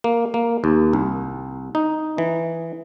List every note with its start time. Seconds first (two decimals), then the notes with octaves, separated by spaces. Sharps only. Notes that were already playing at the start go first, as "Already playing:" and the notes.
0.04 A#3
0.34 A#3
0.64 D#2
0.93 C2
1.75 D#4
2.18 E3